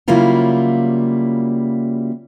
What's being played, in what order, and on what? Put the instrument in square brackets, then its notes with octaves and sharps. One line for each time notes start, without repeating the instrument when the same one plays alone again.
[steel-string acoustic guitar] C#3 F#3 G3 A#3 E4 F4